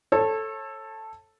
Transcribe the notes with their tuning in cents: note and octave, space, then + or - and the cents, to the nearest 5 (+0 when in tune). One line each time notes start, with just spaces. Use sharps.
A4 +0 C#5 -30